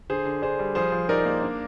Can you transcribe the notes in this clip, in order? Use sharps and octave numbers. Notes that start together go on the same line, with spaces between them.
D3 G#4 C5
D3
D4 G#4 C5
G3
F3 G#4 C5
F3
D#4 A#4 D5
A#3
D4